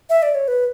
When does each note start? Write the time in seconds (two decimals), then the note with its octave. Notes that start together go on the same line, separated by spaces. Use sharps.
0.10 E5
0.22 D5
0.35 C#5
0.48 B4